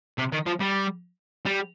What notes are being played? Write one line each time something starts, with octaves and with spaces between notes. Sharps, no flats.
C3
D#3
F3
G3
G3